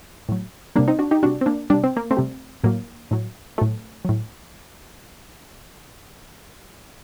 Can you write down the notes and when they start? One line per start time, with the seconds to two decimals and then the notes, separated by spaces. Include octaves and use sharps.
0.29 A2 F#3
0.76 C3 G3 A#3 D4
0.88 C4 D#4
0.99 D4 F#4
1.11 D#4 G4
1.23 C3 G3 D4 F#4
1.41 C4
1.46 A#3 D4
1.70 C3 G3 D4
1.84 C4
1.97 A#3
2.11 A3 C4
2.17 C3 G3
2.64 A2 F#3 A#3
3.11 A2 F#3
3.58 A2 F#3 A3
4.05 A2 F#3